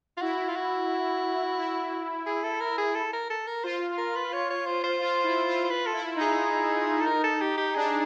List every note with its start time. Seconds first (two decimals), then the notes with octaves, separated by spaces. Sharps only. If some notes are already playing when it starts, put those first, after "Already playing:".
0.17 F4
0.21 E4 F#4
0.49 F4
0.56 F#4
1.58 E4
2.26 G#4
2.43 A4
2.60 A#4
2.78 G#4
2.95 A4
3.13 A#4
3.30 A4
3.47 A#4
3.64 F4 C5
3.98 A#4
4.16 B4
4.33 C#5
4.50 C#5
4.66 C5
4.84 C5
5.01 F4
5.24 E4
5.47 F4
5.64 C5
5.69 F4 B4
5.86 A4
5.93 E4
6.16 D#4
6.21 G#4
7.00 A4
7.06 A#4
7.24 A4
7.41 G4
7.58 G4
7.75 D4 G#4